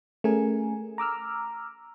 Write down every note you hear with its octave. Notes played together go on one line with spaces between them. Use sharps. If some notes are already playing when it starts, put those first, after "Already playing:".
A3 C#4 G#4 A#4 G#5
A#5 D6 E6 F6